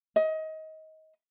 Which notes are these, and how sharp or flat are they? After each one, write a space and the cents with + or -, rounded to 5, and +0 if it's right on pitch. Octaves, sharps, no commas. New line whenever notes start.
D#5 +25